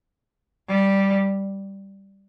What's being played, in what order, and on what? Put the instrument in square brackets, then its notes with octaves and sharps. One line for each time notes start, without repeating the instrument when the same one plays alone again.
[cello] G3